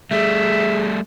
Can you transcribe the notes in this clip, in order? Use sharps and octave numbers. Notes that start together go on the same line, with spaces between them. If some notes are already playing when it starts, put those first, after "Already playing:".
G3 A3 G#4 E5